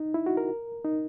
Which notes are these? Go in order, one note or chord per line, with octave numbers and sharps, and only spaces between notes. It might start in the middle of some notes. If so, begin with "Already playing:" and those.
Already playing: D#4
E4
F#4
A#4
D#4